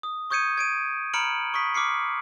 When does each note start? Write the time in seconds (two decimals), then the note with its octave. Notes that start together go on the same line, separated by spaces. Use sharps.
0.03 D#6
0.30 C#6 D#6 G6 G#6 C#7 D#7
0.58 G#6 D7 D#7
1.14 A#5 B5 F6 C#7 D7 F#7
1.54 C#6 D#6 B6
1.74 D6 F6 C7 C#7